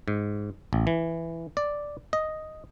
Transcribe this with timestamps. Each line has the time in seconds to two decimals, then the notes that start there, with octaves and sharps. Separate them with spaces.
0.08 G#2
0.73 A1
0.87 E3
1.57 D5
2.13 D#5